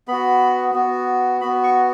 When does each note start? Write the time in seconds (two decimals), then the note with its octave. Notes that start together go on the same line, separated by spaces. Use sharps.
0.08 B3 F#4 B5
0.74 B3 F#4
1.41 B3 F#4 B5
1.64 C#6